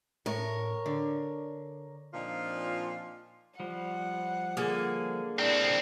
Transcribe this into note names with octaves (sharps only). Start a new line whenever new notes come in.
A2 A#4 C#5
D3
A#2 F3 C4 D4 D#4 F4
F3 G3 F#5
D3 A#3 G#4
C4 D4 E4 F5 A#5